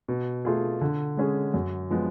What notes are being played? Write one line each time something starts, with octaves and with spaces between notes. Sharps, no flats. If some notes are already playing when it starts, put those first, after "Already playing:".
B2
A3 F4 G#4
D3
G#3 C#4 G#4
F#2
F3 G#3 B3